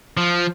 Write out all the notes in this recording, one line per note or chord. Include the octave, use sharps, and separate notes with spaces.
F3